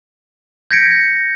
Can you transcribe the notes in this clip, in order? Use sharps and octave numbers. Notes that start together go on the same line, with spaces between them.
G6 G#6 A#6 B6 C#7 D7